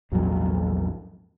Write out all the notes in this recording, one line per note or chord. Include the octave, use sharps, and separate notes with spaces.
A#1 E2 G#2 F#3